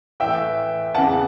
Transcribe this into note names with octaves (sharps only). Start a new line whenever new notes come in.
A2 E3 E5 G5
E2 C#3 E3 F#5 A5